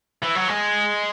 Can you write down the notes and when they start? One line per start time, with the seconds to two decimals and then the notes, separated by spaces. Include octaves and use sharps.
0.23 E3
0.36 F#3
0.49 G#3